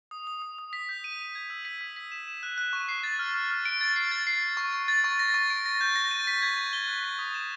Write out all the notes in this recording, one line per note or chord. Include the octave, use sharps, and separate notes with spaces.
D#6
D#6
D#6
D#6
B6
G6
D#7
D#7
G#6
E6
B6
E6
B6
E7
E7
F#6
F#6
C#6
C7
A6
F6
F6
F6
D7
A6
C7
A6
C7
C7
C#6
C#6
A6
C#6
A#6
C#6
D7
A#6
G6
A#6
D#7
B6
G#6
B6
G7
F#6
B6
D#6
E7